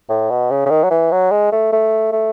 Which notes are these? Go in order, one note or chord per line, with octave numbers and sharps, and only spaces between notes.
A2
B2
C#3
C#3
D#3
F#3
E3
F#3
G#3
A3
A3
A3